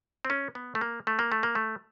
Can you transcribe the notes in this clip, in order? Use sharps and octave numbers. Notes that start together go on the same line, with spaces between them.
C4
C#4
B3
A3
A#3
A3
A#3
A3
A#3
A3